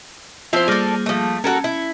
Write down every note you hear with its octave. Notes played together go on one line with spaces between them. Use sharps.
F3 C4 E4 F4 C5
G3 A#3 G#4 A4 D5
F3 A3
C#4 F#4 A4 A#4
E4